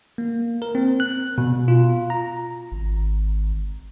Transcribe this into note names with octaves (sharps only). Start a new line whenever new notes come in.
A#3
A#4
C4
F#6
B2
F4
A#5
G#1